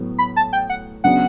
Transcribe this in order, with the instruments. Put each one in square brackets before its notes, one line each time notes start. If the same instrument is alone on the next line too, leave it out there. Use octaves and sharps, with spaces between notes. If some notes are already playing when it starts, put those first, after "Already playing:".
Already playing: [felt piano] A2 F#3 B3
[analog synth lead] B5
A5
G5
F#5
[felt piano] C#3 F#3 B3 D4 [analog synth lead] F#5